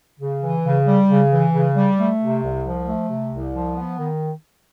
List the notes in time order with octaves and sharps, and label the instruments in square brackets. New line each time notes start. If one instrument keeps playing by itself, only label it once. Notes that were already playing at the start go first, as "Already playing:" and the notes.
[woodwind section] C#3
E3
C#3
G3
C#3
E3
C#3
G3
A3
C3
C2
F3
A3
C3
C2
F3
B3
D#3